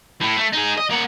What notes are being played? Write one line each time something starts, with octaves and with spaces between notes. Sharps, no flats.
A2
A3
D#4 G#4
D#5
A#3 F#5